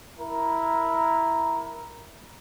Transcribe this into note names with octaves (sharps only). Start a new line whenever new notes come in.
E4 A#4